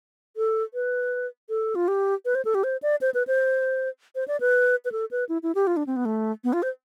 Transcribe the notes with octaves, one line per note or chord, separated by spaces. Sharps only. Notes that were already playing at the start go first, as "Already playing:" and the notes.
A4
B4
A4
F4
G4
B4
C5
A4
G4
C5
D5
C5
B4
C5
C5
D5
B4
B4
A4
B4
E4
E4
G4
F4
D4
C4
B3
A3
B3
F4
C5